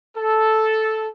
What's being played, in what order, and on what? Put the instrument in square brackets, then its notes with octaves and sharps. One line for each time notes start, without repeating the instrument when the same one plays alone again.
[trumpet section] A4